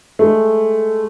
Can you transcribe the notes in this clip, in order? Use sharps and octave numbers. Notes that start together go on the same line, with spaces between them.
G#3 A3